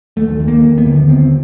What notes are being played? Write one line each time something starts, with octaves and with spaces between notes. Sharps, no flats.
D#2 A3
D#2
A#3
D#2
B3
D3
D#2 C4